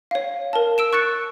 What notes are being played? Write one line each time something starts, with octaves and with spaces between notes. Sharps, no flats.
C#5 F5
A#4 A5
E6 D7 E7
C#6 F#6 A6 C#7